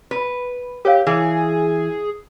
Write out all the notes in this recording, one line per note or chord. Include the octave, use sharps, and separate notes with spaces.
B4
G4 A#4 C#5 F5
E3 G#4